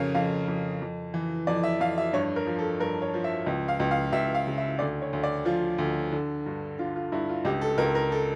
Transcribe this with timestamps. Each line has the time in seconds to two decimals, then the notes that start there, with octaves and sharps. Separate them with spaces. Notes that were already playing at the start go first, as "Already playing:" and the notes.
Already playing: F2 C#3 A#4 C#5 F5
0.15 F2 F5
0.48 F2
0.81 F2
1.14 E3
1.47 F2 D5
1.63 E5
1.80 F2 F5
1.98 E5
2.13 G2 C#5
2.36 A#4
2.47 F3
2.59 A4
2.80 G2 A#4
3.02 C#5
3.14 F3
3.24 E5
3.46 C#2
3.68 F5
3.80 C#2
3.91 F5
4.12 C#2 E5
4.35 F5
4.47 C#3
4.58 E5
4.79 D2 D5
5.02 C#5
5.13 D2
5.24 D5
5.45 F3 F4
5.78 D2
6.12 D3
6.46 G2
6.79 D3 F4
6.96 F4
7.12 G2 E4
7.29 F4
7.45 C#2 G4
7.61 A4
7.78 C#2 A#4
7.95 A#4
8.12 A4